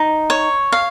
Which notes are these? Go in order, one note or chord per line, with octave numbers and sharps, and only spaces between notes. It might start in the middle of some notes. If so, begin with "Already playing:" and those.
Already playing: D#4
C#5
F5